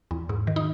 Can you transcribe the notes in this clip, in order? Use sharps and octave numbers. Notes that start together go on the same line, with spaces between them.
E2
G#2
D#3
D#4